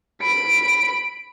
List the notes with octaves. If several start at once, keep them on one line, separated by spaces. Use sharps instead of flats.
B5 D7